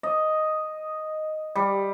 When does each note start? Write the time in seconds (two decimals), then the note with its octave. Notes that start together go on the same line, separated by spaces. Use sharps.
0.03 D#5
1.56 G3